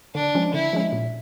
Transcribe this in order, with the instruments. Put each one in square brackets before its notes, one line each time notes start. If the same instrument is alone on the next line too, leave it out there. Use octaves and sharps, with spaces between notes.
[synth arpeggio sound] D3 [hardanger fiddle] D4
[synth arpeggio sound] F3 G#3 C#4
[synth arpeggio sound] D3 [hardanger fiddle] E4
[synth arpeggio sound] F3 G#3 C#4
A#2